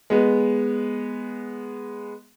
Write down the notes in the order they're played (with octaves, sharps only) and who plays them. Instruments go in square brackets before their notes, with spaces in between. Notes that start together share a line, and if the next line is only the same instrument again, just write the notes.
[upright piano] G#3 B3